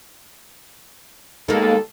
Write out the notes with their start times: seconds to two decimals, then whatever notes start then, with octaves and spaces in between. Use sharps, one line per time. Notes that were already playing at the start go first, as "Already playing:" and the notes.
1.48 D#2 G#3 A#3 B3 D#4 A4